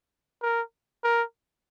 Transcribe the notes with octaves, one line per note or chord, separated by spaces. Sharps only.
A#4
A#4